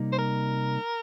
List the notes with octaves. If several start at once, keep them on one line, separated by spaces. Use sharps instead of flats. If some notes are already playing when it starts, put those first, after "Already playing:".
Already playing: C3 G3 A#3 D#4
C5
A#4